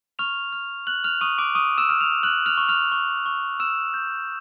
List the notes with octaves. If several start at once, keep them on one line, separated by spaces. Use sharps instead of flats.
C#6 F6 F7
F6
F6 F#6 F#7
F6 F7
C#6 D#6 D#7
D6 D7
C#6 D#6 D#7
E6 E7
F6
F6 F7
F6 F#6 F#7
F6 F7
C#6
F6 F7
C#6
C#6
E6 E7
G6